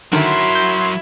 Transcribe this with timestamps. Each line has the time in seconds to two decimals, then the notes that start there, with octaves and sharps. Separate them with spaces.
0.13 D3 D#3 F#3 E4 F#4 A#4 C6
0.55 G6